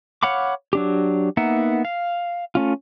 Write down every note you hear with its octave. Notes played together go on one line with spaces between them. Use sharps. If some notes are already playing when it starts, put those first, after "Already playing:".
C#5 F5 F#5 B5 D6
F#3 D4 G4
A#3 B3 D#4 E5 F#5
F5
A3 C#4 F4